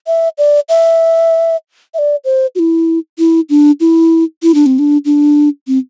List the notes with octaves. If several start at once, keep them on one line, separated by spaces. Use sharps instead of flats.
E5
D5
E5
E5
D5
C5
F#4
E4
E4
D4
E4
E4
D4
C4
D4
D4
C4